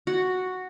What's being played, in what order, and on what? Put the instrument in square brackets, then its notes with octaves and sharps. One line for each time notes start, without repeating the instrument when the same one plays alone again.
[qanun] F#4